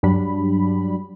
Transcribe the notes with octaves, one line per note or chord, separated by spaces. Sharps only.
G2 F#3 G3 D4 B5